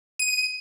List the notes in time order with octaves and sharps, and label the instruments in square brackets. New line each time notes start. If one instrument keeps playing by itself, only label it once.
[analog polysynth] D#7